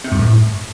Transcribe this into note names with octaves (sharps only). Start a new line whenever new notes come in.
C3
G2
A2